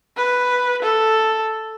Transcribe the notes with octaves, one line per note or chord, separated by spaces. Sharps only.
B4
A4